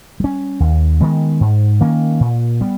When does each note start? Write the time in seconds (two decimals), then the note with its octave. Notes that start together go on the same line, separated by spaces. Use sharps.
0.20 G3 C#4
0.60 D#2
1.01 D#3 G#3 B3
1.41 G#2
1.80 D#3 A#3 C#4
2.20 A#2
2.61 G3 B3